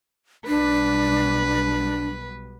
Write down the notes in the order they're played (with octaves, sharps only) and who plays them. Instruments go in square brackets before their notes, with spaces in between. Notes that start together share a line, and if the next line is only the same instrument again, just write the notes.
[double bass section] B1 B2 G3 [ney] D4 [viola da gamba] B4